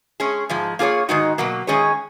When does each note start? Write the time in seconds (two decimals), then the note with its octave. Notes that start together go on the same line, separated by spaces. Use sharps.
0.20 G#3 C#4 G#4
0.49 G#2 F3 G#3
0.79 A#3 F4 G#4 C#5
1.09 G#2 D#3 G#3 D#4 F#4
1.38 B2 F#3 A#3
1.67 D#3 G#3 C#4 G#4 C#5